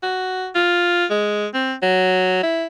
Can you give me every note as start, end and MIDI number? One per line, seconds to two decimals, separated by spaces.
0.03 0.50 66
0.55 1.05 65
1.10 1.46 56
1.54 1.74 60
1.82 2.43 54
2.43 2.67 64